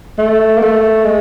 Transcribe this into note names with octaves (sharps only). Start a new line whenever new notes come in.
A3
A#3
A3
G#3